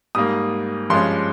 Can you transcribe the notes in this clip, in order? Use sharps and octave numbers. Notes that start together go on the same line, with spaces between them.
G#2 G3 A#3 D#6
G2 F3 G#3 C#4 C6